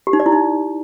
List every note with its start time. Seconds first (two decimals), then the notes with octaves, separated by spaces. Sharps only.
0.07 G4
0.13 D#4
0.20 D5
0.26 E4
0.32 D#4